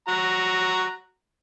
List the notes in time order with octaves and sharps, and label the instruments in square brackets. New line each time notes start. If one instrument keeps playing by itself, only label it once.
[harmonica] F#4 A#5